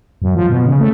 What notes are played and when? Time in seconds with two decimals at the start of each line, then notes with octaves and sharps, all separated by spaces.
0.22 F#2
0.35 F3
0.49 B2
0.66 C#3
0.80 A3